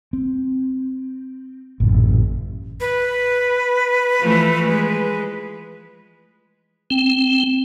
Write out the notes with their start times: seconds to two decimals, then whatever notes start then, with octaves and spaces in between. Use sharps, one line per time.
0.13 C4
1.80 A1 F#2 A#2 C#3
2.80 B4
4.21 E3 F3 A3
4.68 G#3
6.90 C4